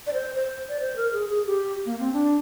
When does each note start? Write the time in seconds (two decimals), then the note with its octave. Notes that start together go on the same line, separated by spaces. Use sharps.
0.07 D5
0.13 C5
0.35 C5
0.68 D5
0.80 C5
0.96 A#4
1.13 G#4
1.30 G#4
1.46 G4
1.86 A#3
1.99 C4
2.13 D4